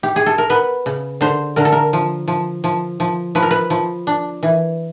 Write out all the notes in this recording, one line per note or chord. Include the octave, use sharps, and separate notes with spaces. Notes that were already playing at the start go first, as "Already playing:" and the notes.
G4
G#4
A4
A#4
B3 B4
C#3
D3 C5
D3 A#4
A4
A#4
F3
F3
F3
F3
F3 B4
A#4
B4
F3
D4
E3